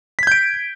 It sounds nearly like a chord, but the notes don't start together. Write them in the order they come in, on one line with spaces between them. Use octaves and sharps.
B6 G#6 G6 D7